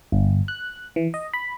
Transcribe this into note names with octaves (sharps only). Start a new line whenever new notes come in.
G1
F#6
E3
D#5
B5